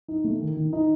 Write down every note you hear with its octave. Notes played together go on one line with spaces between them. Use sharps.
D#4
A3
D#3
D#3
D#4